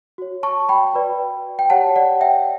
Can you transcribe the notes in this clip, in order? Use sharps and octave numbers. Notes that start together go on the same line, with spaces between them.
F#4 C#5
A5 C#6
G5 B5
F#4 B4 D5
G5
G4 C#5 F#5 A5
D5 F#5
E5 G5